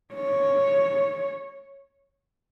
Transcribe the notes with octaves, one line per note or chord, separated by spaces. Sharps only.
C#5